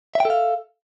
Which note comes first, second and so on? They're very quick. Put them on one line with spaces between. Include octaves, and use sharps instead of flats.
E5 G5 A4 F5